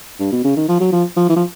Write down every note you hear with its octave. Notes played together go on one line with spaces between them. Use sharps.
G2
B2
C#3
D#3
F3
F#3
F3
F3
E3
F3